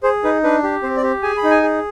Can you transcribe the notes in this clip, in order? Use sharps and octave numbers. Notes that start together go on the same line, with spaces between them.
G#4 C5
D#4 B4
D4 B4
G4
C4 C5
D5
G4
G#4 G#5
B5
D#4
G#5
G#4